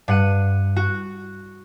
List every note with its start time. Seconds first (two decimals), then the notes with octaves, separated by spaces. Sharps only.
0.08 G2 F#5 D#7
0.76 F#4